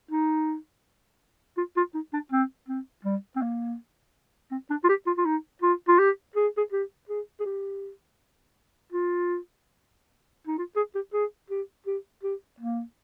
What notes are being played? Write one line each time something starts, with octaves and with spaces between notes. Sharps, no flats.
D#4
F4
F4
D#4
D4
C4
C4
G3
C4
A#3
C4
D4
F4
G4
F4
F4
D#4
F4
F4
G4
G#4
G#4
G4
G#4
G#4
G4
F4
D#4
F4
G#4
G4
G#4
G4
G4
G4
A#3